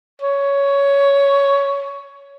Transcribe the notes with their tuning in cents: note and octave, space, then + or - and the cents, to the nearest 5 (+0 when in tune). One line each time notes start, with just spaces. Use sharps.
C#5 +10